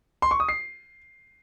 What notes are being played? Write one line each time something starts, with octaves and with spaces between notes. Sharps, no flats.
C6
C#6
D#6
C7